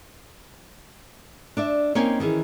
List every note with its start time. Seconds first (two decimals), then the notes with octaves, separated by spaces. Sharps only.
1.57 D4 D5 E5
1.95 A#3 C4 C#4 D#4 C#5 G#5
2.20 D#3 E3 C#4 G#4